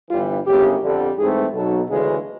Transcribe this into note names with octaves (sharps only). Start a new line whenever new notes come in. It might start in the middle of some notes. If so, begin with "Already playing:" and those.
G1 G2 E3 G3 F4
G1 F#2 C#3 G4
F2 D3 G3
G#2 E3 A3 C4 G#4
B1 B2 F#3 A4
D2 C#3 E3 G#3